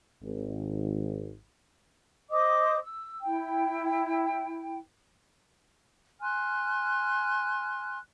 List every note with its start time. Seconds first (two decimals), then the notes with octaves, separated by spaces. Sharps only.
0.23 G#1
2.30 C5 D#5 D6 D#6
2.81 E6
3.22 E4 G5
6.21 G#5 C6 F6 F#6